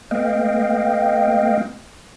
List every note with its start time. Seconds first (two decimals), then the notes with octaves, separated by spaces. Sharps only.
0.11 A3 B3 D#5 F5 G5